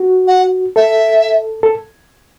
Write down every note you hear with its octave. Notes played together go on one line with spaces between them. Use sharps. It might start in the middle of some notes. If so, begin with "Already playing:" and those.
Already playing: F#4
F#5
A4 E5
A4